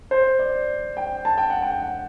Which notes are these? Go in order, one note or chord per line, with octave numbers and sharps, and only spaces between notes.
C5
D5
G5
A5
G5
F#5
G5
F#5